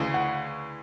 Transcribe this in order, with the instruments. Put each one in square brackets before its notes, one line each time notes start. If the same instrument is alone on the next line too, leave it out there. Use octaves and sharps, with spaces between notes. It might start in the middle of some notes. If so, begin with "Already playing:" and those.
Already playing: [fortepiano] D2 C#3 E3
[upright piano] F#5